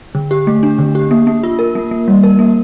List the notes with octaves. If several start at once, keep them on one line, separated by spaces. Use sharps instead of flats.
D3
G4
A3
D4
D3
G4
A#3
A#3
F4
A#4
A#3
A#3
G3
A#4
A#3